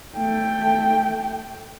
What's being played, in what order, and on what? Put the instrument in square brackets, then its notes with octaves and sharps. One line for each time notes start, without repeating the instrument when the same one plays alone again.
[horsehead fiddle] A3 G5